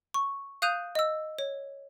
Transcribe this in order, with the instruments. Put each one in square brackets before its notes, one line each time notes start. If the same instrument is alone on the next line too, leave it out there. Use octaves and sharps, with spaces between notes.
[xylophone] C#6
F5 D#6 F#6 G6 D#7 F7
D#5 E6
C#5